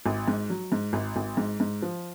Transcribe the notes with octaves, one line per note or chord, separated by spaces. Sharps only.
G#1
G#2
F#3
G#2
G#1
G#1
G#2
G#2
F3